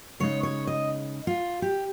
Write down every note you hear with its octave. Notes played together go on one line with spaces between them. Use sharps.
C#3 G#3 D#4 C#5
C#5
D#5
F4
G4